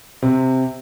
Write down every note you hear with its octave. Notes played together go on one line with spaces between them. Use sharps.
C3